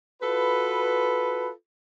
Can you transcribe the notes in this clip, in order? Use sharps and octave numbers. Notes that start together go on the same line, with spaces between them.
F4 F#4 A4 B4